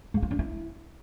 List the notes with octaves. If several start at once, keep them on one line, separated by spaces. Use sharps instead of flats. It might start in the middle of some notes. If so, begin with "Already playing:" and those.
G#3
F4
D4
E4